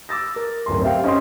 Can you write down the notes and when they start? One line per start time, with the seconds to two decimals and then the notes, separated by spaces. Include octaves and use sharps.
0.09 D6 E6 A6 A#6
0.36 A#4
0.66 D1 F#2 C6
0.82 C4 G4 E5 F5 G5
1.04 C#4 D#4 C5 D#5 C6